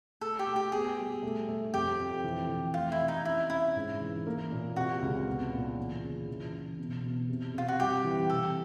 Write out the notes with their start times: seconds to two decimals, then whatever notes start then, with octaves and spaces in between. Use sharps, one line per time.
0.21 A3 A4
0.39 G4
0.47 A3
0.56 G4
0.72 B3 G#4
0.98 G3
1.23 A3
1.48 A3
1.74 F2 G4
1.99 F2
2.24 E3
2.49 E3
2.74 A3 F4
2.92 E4
2.99 C3
3.08 D#4
3.25 C#4 E4
3.50 C#4 E4
3.75 G#2
4.01 E3
4.27 A#3
4.52 A#2
4.76 C3 F#4
5.02 C#2
5.27 B3
5.53 A#2
5.77 E3
6.03 C#3
6.28 E3
6.53 E3
6.79 B2
7.03 B2
7.29 C3
7.55 C3 F4
7.68 F#4
7.79 G3 G4
8.04 E3
8.30 C3 A4